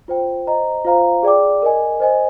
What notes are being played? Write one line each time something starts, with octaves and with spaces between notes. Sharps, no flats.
F4 C5 G5
C5 D#5 A#5
F4 C5 F5 A#5
G#4 D5 G5 D6
A#4 D#5 G#5
C5 D#5 G#5